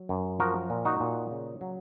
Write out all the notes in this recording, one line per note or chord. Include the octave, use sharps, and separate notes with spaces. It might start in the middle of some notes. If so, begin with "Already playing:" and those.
Already playing: F#3
F#2
F3 F#4 A#4
A#2
D#4 F#4
A#2
C#3
F#3